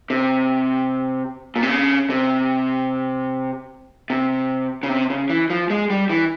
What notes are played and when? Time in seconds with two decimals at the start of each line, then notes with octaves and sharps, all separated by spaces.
0.10 C3
1.56 A#2
1.63 C3
1.69 C#3
2.10 C3
4.10 C3
4.83 C#3
4.89 C3
5.10 C#3
5.30 E3
5.50 F3
5.70 G#3
5.90 G3
6.10 E3